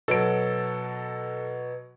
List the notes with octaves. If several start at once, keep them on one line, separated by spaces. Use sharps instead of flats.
B2 F#3 A4 D7